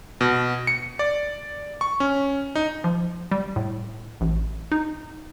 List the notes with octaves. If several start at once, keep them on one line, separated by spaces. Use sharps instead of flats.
B2
C#7
D5
C#6
C#4
D#4
F3
G3
A2
A1
D#4